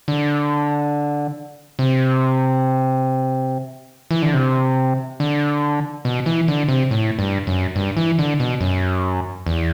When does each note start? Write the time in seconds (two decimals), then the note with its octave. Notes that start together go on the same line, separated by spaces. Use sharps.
0.08 D3
1.79 C3
4.11 E3
4.22 D3
4.34 C3
5.20 D3
6.05 B2
6.26 E3
6.48 D3
6.69 C3
6.91 A2
7.19 G2
7.47 F#2
7.76 G2
7.97 E3
8.19 D3
8.40 B2
8.61 F#2
9.47 E2